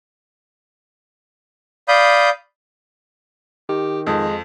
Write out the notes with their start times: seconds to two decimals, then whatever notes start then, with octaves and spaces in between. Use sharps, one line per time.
1.88 D5 F5 B5 D#6 G6
3.69 D#3 G4
4.07 F2 G#3